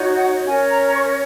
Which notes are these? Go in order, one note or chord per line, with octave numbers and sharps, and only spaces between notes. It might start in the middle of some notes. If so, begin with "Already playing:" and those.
Already playing: D#4 F#4 C#5
F#5
C#4 A#4 C#5 G#5
A#5
A#5
C#6